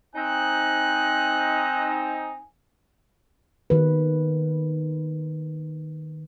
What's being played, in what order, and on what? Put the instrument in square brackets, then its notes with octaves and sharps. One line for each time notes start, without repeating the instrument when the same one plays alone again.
[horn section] C4 D#4 [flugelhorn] G#5 [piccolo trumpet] F#6
[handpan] D#3 B4